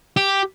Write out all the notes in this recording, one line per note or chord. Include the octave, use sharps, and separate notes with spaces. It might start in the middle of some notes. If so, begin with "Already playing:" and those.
G4